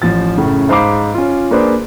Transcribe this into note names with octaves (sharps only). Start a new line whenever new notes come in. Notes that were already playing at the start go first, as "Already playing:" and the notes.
A1 F3 A6
F#2 A2 C#3
G#2 C5 F5 B5 D6 C7
C#4 F4
A#3 D4 G#4 B4 C5 D5